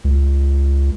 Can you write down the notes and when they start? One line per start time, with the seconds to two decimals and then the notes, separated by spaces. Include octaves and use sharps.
0.05 C#2